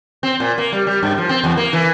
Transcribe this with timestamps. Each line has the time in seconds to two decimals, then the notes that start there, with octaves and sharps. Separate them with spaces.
0.23 C4
0.40 A#2
0.58 A#3
0.72 G3
0.87 G3
1.03 G2
1.18 F3
1.29 C4
1.44 E2
1.57 A#3
1.73 E3